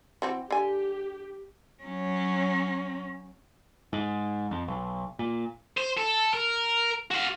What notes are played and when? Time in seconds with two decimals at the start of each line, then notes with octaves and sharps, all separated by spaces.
0.22 E3 C4 F#4
0.50 D3 G4 G#5
1.83 F#3 C#4
3.93 G#2
4.51 F2
4.68 B1
5.19 A#2
5.78 C5
5.98 A4
6.34 A#4
7.11 F#4 F5